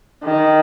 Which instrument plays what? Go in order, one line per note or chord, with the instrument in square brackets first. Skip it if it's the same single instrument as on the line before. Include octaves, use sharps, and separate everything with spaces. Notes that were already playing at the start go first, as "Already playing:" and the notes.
[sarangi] D#3